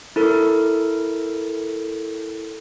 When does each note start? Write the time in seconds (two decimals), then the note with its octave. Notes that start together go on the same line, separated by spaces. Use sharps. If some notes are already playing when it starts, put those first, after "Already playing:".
0.16 E4 A4 A#4